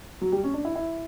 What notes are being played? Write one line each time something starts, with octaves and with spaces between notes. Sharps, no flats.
F#3
G3
C#4
D4
E4
E4